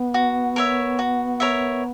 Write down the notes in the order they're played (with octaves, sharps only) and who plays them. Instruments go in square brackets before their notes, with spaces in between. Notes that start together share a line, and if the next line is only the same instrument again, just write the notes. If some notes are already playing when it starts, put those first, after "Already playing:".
Already playing: [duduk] B3
[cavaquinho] F#4
A#4 C#5 E5
F#4
A#4 C#5 E5